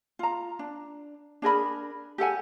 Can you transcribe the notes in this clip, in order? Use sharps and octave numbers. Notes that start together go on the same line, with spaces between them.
F4 A#5
D4
D4 G#4 A#4 B5
G4 A4 F#5 G#5